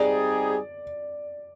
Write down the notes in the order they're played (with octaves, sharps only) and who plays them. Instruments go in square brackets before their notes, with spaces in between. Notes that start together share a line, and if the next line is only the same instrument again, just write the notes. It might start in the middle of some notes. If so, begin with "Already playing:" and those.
Already playing: [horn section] G3 C4 D#4 G#4 [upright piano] D5